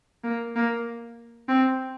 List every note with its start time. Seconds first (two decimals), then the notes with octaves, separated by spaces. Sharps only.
0.24 A#3
0.56 A#3
1.48 C4